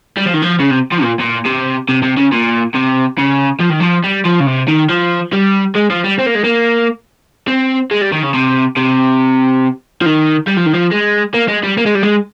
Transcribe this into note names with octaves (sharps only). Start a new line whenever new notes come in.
G3
F3
D#3
F3
C#3
C3
F3
A#2
A#2
C3
C3
C3
C#3
A#2
C3
C#3
F3
D#3
F3
G3
F3
C#3
C3
D#3
F3
G3
G#3
F3
G3
C4
A#3
G#3
A#3
C4
G#3
G3
D#3
C#3
C3
C3
F3
D#3
G3
F3
D#3
F3
G#3
A#3
G#3
G3
A#3
G#3
G3
G#3